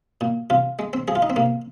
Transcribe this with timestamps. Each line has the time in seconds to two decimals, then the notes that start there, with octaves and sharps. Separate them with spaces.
0.21 A#2
0.50 C3 F4
0.79 G#3
0.93 C4
1.08 F3 G#4
1.15 F4
1.22 D#4
1.30 C4
1.36 C3 A#3